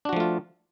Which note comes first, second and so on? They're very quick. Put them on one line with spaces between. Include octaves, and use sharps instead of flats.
D4 F#4 F3 A3 F4